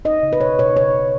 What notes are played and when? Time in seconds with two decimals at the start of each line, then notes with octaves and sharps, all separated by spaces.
0.05 D#4 D#5
0.23 C#3
0.33 B4
0.41 B2 C#5
0.59 B2 C#5
0.76 C#3 C#5
0.95 C#3